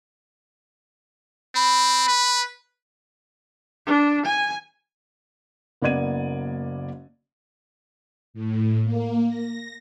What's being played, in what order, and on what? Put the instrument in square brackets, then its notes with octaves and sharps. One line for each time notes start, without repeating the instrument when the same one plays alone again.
[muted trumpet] C4 [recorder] B5
[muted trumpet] B4
[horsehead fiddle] D4
G#5
[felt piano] F#1 A#3 B3 D5 G#6 D#7
[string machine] A2
A#3
A#6